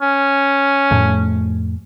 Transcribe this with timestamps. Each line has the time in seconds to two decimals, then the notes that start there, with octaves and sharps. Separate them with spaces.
0.02 C#4
0.91 F2 A2 A3